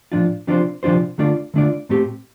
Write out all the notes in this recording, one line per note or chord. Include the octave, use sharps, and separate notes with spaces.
A2 F3 D4 F4
C3 F3 D4 F4 C5
C3 F3 D4 F4 C5
D3 A3 D4 F4 D5
D3 A3 D4 F4 D5
A2 A3 C4 G4